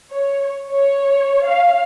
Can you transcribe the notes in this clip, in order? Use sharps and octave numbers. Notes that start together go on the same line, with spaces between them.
C#5
C#5
F5